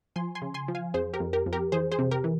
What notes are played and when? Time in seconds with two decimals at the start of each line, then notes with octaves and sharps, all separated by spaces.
0.16 F3 G#5 C6
0.35 G#5 C6
0.42 C#3
0.54 G#5 C6
0.68 F3
0.75 F5 G#5
0.94 F2 G#4 C5
1.13 G4 A#4
1.20 F2
1.33 G4 A#4
1.46 F2
1.53 G4 A#4
1.72 E3 G#4 C5
1.92 G#4 C5
1.99 C3
2.11 G4 A#4
2.24 E3